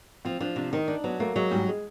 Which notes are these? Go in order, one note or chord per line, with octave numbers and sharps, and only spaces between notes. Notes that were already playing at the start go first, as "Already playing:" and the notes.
F3 C4
F3 D4
C3 D4
D#3 D#4
D4 D#4
F#3 B3
A3 A#3
F#3 G#3
G#2 G3
G#3